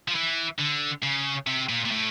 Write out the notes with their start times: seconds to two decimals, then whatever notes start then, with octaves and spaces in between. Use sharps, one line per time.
0.08 F3
0.15 E3
0.59 D3
1.03 C#3
1.47 C3
1.69 A#2
1.85 A#2
1.91 A2